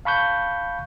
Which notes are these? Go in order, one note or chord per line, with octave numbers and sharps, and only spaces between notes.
F5 A5 B5 C#6 F#6 G6